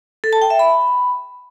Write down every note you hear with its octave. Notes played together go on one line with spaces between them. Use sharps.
A4
A5
G5
E5
B5